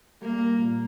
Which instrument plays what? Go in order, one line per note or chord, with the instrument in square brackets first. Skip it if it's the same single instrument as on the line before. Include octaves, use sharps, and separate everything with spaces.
[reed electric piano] G3 [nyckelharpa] A#3
[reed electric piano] A#2